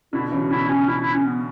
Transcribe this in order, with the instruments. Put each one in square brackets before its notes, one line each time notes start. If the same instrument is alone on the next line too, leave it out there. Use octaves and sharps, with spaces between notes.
[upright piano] B2 D3 [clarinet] E4
[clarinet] E4
[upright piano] C#3 E3
[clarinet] F#4
[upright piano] B2 D3 [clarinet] E4
[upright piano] B2 [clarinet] C#4
[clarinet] E4
E4
C#4
B3